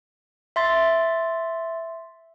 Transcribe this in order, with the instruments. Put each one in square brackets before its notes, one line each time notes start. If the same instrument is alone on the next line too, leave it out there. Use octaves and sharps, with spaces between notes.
[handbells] E5 C6 A6